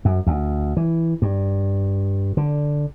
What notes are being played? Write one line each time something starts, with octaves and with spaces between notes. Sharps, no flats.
F#2
D2
E3
G2
D3